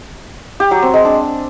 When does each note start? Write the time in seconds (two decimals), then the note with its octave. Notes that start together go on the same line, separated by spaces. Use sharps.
0.60 G4
0.71 F#3
0.82 C4
0.94 G#3
1.05 D4